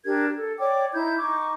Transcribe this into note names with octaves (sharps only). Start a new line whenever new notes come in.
D4 G4 A#4 G#6
A4
C#5 D5 G5 D6
D#4 E4 G6 G#6
D#4 C#6 D6